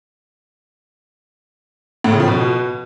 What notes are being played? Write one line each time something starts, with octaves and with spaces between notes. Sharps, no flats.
A2
C#3
F3
B2